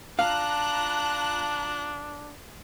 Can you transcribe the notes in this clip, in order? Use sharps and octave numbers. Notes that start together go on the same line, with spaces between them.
D4 F4 F5 A5 A#5 F#6